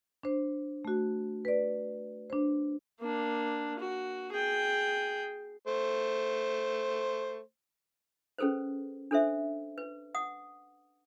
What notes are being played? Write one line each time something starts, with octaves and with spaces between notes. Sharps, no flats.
D4 C5
A3 F#4
B4 D5
D4 C5
A#3 D4
F#4
G#4 G5
A3 C5
C#4 G#4 A4 B4 C5
D4 A4 C5 E5
B4
F#5 D#6